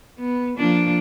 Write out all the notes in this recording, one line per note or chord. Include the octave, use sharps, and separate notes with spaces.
B3
F3 A#3 D4